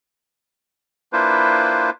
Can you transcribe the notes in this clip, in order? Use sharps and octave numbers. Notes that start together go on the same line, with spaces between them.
A#3 D4 E4 F4 B4 C5